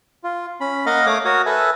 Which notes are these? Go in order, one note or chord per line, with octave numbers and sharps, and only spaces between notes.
F4
C#4 B5
A#3 A#4 D#5 F5 F#5 F6
A3 C#5 F5 D6 D#6
F#4 A#4 C#5 D#6
A4 B4 E5 G#5